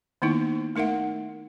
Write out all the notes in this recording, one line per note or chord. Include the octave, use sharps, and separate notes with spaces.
D#3 A#3 B3 D#4 E4
A3 D#4 A#4 E5 F#5